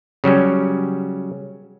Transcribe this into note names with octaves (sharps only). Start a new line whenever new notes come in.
C#3 F#3 G3 C#4